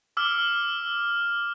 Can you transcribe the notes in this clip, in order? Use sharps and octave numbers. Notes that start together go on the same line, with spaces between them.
D6 E6 F6